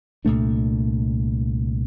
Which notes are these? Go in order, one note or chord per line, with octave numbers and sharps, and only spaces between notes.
C2 A#2 A3 D4